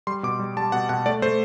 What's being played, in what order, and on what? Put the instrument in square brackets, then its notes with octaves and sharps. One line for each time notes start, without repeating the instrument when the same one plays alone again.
[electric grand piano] G3 C6
B2 D6
G3
G3 A5
B2 F#5
B2 F#5
A3 D5
A3 C5